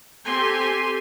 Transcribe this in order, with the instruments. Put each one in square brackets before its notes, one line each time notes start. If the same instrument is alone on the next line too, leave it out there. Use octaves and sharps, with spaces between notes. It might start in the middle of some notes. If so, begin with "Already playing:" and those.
[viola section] C4 G4 A4 G#5 C6